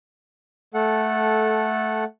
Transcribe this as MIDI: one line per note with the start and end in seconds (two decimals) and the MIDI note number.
0.74 2.04 57
0.74 2.04 69
0.74 2.04 78